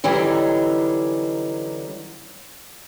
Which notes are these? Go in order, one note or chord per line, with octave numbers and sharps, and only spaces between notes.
D3 E3 F#3 G3 C#4 D#4